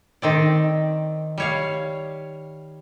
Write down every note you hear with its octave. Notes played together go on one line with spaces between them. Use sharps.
D#3 C4 D5
G3 C#5 F5